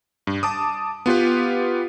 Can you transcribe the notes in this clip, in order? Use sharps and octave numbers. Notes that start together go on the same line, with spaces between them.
G2
A5 D6 D#6
B3 F4 G4 B4